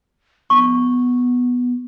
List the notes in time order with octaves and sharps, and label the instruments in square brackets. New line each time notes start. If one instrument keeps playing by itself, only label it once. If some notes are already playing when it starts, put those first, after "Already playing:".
[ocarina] B3 [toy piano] C#6